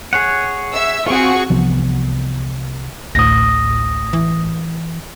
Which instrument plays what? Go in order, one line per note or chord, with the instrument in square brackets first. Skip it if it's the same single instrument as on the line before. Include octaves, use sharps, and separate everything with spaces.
[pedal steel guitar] G#4 C#5 F#5
[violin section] E5 E6
[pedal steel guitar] C4 F4 [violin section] F#4 G#4 C#6
[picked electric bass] C2 E3 F3 B3
[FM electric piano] A1 A2 [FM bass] D2 [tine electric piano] D#6 A#6
[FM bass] E3